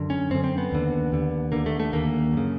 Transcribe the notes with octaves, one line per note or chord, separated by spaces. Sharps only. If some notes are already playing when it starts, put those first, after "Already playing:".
Already playing: F#2 D3
C#4
F#2 D3 C4
C4
B3
D#2 D3
D#2 D3
D#2 D3 A#3
A3
A3
D#2 D3 A#3
F#2 C#3